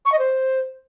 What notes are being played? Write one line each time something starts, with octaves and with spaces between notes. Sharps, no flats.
C#6
D#5
C5